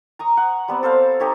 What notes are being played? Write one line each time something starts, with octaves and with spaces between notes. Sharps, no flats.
A#5 C#6 D#6
F#5
G3 B3 C4
A4 C5 F5
D#4 G4 A4 C#5